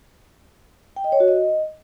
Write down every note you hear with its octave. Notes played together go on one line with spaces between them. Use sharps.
G5
D#5
C#5
F#4
D#5